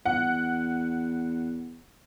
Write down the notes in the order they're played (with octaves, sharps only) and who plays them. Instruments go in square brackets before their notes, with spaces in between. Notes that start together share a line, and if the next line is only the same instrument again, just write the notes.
[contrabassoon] E2 [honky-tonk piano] F#5